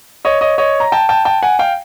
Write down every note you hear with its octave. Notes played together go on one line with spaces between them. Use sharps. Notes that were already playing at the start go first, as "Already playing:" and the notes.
C#5 D#5
C#5 D#5
C#5 D#5
A#5
G5 A5
G5 A5
G5 A5
F#5 G#5
F5 G5